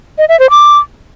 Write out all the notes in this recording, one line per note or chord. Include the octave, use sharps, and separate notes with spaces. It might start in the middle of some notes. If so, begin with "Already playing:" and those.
D#5
E5
C5
D6